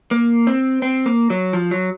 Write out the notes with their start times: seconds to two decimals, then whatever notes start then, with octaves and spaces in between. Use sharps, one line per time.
0.11 A#3
0.47 C4
0.82 C4
1.06 A#3
1.30 F#3
1.53 F3
1.71 F#3